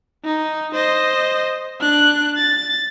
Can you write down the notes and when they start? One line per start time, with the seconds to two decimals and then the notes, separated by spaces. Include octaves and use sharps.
0.25 D#4
0.74 C5 D#5
1.81 D4 F#6
2.37 A6